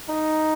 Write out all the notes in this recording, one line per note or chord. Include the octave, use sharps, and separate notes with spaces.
D#4